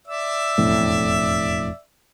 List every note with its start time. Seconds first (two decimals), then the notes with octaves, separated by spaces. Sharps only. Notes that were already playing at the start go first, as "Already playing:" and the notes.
0.07 D5 E5 E6
0.58 E1 F2 A2